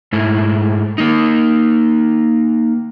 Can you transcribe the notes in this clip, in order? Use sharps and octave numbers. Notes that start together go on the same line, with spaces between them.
G#2 A3 E4
A#3 D#4